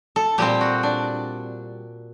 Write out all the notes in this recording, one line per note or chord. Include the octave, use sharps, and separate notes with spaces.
A4
A#2 G3 C4 G4
F#4
D4